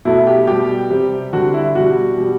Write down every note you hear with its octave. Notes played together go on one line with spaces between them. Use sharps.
B2 F#3 A3 E4
G4
B2 G3 G4
C3 G3
D3 G3 F#4
E4
B2 G3 F#4
B2 G3